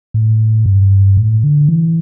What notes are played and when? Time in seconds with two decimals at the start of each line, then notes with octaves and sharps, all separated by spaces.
0.14 A2
0.66 G2
1.17 A2
1.44 D3
1.69 E3